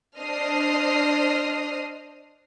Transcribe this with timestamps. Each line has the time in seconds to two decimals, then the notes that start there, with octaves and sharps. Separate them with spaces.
0.20 D4 C5 D#5 D#6 F6 C7